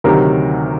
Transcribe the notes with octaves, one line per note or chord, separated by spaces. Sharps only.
D2 C3 D#3 F#3 A#4